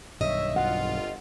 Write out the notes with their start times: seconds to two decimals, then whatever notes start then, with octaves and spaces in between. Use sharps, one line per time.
0.21 B1 G2 D#3 C#5 D#5 E5
0.56 G1 C2 F4 F#5